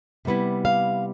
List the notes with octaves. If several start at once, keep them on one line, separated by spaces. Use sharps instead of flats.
C3 G3 B3 E4
F5